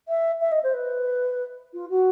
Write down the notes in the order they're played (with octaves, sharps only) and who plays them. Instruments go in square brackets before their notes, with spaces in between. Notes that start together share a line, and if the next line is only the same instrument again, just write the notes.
[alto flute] E5
E5
D#5
C5
B4
F4
F#4